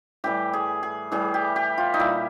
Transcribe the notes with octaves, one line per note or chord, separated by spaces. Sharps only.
A2 E3 G3 G4
G#4
G#4
A2 E3 G3 G#4
G4
G4
F4
D#4
A#2 G3 E4